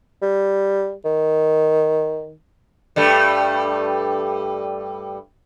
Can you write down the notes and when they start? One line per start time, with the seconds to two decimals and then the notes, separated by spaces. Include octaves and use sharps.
0.22 G3
1.05 D#3
2.96 G2 G3 A3